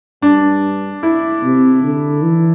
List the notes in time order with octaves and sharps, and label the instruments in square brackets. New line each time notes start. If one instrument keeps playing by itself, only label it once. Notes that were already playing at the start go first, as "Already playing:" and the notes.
[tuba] G2 [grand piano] D4
[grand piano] E4
[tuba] C3
D3
E3